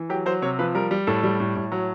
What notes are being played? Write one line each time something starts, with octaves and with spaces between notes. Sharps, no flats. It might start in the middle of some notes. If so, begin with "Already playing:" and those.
Already playing: E3
F#3 G4
F#3 C5
C3 C#5
F3 B4
G3 A#4
G3
A2 A4
G3
A2
A2
F#3